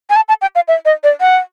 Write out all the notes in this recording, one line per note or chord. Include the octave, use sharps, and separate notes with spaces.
G#5
A5
A5
G5
F5
E5
D#5
D5
F#5